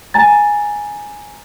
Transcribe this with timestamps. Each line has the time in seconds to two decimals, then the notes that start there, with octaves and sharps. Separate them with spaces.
0.14 G#5 A#5 A6